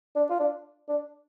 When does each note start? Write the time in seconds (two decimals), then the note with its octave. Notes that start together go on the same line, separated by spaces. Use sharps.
0.16 D4
0.30 F4
0.40 D4
0.89 D4